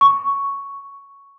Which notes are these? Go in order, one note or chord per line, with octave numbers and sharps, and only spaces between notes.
C#6